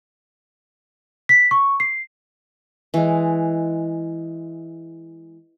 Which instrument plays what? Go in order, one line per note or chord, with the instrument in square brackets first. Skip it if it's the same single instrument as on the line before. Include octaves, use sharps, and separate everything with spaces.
[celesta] B6
C#6
C7
[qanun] E3 G#3